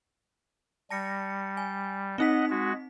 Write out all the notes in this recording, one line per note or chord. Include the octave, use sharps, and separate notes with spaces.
G3 A5 A#6 C#7
G#5
C4 D#4 D#5 F#5 B6
G#3 F#4